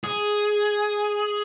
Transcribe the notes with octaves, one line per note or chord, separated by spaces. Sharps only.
G#4